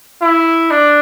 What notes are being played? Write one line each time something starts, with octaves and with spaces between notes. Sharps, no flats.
E4
D4